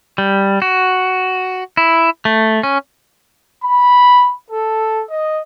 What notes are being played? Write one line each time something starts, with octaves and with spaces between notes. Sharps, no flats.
G3
F#4
E4
A3
C#4
B5
A4
D#5